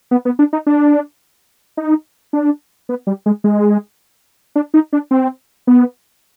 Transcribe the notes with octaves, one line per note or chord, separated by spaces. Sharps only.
B3
B3
D4
D#4
D4
D#4
D4
B3
G3
G#3
G#3
D4
D#4
D4
C4
B3